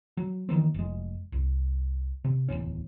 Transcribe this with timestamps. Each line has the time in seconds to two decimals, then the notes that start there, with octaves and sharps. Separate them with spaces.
0.17 F#3
0.49 D#3 E3 A#3 C4
0.74 F1 G#3
1.32 C2
2.24 C3
2.48 D1 G#1 E2 C#4